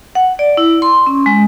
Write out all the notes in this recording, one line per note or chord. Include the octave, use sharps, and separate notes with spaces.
F#5
D5
E4
C6
C#4
G#3